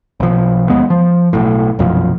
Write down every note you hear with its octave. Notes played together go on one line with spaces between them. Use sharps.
B1 F3
D#2 G#3 B3
F3
B1 A2
F1 B1 F#2 F3